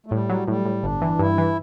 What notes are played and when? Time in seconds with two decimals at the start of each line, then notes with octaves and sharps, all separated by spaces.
0.06 A3
0.11 A2 G3
0.29 F#3
0.48 A2 G3
0.65 A2
0.83 G1 D4
1.02 E3
1.19 G2 E4
1.38 E3